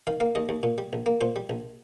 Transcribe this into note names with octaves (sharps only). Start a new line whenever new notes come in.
D#3 F5
A#3 F5
D#2 D#5
D#2
A#2
G3
A#1
A#3
A#2 C5
G3
A#1